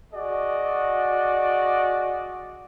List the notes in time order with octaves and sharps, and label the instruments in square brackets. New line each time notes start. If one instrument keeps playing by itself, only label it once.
[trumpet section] F#4 G#4 D5 D#5